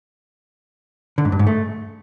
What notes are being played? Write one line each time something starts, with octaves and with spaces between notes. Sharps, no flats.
D3
G#2
G2
G#2
A3